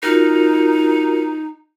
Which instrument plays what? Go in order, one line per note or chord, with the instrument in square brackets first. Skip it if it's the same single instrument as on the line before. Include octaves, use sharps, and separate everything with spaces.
[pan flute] D#4 [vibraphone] F4 F#4 A#4